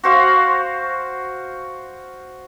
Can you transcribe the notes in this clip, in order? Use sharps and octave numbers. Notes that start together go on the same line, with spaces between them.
F#4 C5 F5